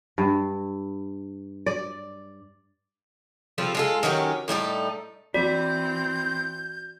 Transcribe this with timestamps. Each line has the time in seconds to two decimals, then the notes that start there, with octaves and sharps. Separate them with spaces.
0.18 G2
1.66 D5
3.58 F3 G3 C4 A4
3.75 G#3 F4 A4
4.03 D#3 F#3 C#4 G4
4.48 A2 G3 D#4 A4
5.34 E3 C4 F#4 D5 G6